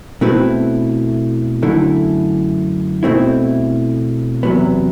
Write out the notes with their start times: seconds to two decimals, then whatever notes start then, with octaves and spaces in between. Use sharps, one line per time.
0.21 B2 A3 C4 E4 B4
1.62 F#2 D3 A3 E4
3.03 B2 A3 C4 E4
4.43 E2 C3 F#3 B3